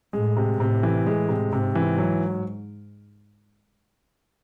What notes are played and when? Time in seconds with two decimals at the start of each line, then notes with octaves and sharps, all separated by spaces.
0.13 A2 G#3
0.37 C3
0.60 A2 C3
0.83 E3
1.07 G#3
1.29 C3
1.52 G#2 C3
1.75 E3
1.98 F#3